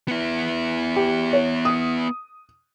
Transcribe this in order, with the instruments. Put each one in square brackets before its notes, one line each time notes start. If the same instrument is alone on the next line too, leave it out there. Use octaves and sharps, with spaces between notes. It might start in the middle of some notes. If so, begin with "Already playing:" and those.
[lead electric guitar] B3 E4
[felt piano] G4
C#5
D#6